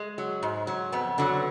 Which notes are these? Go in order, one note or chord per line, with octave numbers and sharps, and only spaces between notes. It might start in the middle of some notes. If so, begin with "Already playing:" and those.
Already playing: G#3
F#3
G#2
F#3
F2 B3
D3 F#3